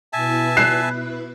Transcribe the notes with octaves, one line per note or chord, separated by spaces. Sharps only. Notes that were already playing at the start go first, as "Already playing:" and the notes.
B2 E4 B4 E5 G#5 A5
F#6 C7 E7